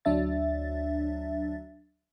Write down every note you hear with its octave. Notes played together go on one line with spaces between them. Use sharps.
D2 F#3 D4 E5 A6